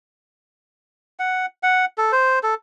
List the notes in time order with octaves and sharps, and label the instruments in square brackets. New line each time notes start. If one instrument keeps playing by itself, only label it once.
[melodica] F#5
F#5
A4
C5
A4